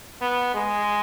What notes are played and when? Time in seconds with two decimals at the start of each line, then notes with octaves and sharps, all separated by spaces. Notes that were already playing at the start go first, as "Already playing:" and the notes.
0.21 B3
0.54 G#3